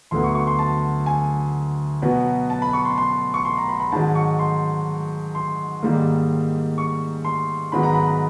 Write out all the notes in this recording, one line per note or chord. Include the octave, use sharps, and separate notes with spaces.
D2 D3 F#3 B3 C6
C#6
C#6
C6
A5
G#5
B2 F#3 B3
A5
B5
C#6
C6
C6
C#6
C6
A#5
B5
B5
G#2 D#3 F#3 A5
C#6
C6
C6
G#2 D#3 G3 A#3
C#6
C6
G#2 D#3 F#3 B3 B5
A#5
B5
B5